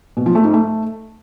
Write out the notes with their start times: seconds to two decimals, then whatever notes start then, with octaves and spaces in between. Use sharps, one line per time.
0.17 B2
0.26 F3
0.35 A3
0.44 G#2
0.53 A3